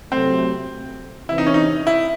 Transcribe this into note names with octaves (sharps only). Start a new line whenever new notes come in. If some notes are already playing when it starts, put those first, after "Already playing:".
C3 F#3 A3 C4
C3 E3 C4 E4
D#4
C#4
D#4
E4